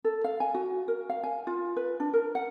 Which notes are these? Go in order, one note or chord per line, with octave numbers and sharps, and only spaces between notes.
A4
F5
G#5
F#4
A#4
F5
G#5
F4
B4
D4
A#4
F#5